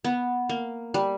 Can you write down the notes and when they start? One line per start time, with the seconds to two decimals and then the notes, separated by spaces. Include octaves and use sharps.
0.04 B3
0.49 A#3
0.94 G3